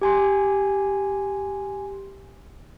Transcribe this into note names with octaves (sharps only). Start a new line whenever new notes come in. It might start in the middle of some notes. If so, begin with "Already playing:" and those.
G4 G#5 C6